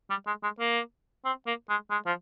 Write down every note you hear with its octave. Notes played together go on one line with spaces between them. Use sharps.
G3
G#3
G#3
A#3
C4
A#3
G#3
G#3
F3